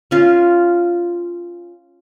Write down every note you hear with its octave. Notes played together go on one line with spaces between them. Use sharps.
C#4 F4